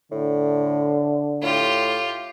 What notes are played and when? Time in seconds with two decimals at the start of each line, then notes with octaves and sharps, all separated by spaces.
0.12 A2 D3
1.42 A2 F4 G4